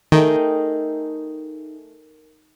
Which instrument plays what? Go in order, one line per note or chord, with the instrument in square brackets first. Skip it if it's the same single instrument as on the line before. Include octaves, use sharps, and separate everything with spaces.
[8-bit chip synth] D#3 [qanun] A3 D#4 G#4 [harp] A#4 G5